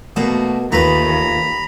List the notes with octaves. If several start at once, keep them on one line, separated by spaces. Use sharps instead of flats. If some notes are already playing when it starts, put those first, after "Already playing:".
B2 A3 A#3 F#4
D#2 A3 F4 B4 A#5 B5